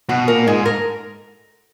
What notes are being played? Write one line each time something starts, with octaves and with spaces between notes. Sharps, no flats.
B2 F#4
A#2 A#4
G#2 G#4
A#4